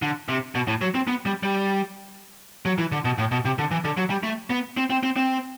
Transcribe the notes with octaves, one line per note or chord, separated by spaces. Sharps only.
D3
C3
B2
A2
F#3
C4
B3
G3
G3
F#3
E3
D3
B2
A2
B2
C3
D3
E3
D3
F#3
G3
A3
B3
C4
C4
C4
C4